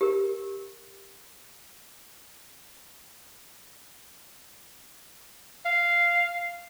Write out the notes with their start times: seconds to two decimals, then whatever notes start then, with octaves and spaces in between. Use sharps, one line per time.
0.01 G4 A#4
5.66 F5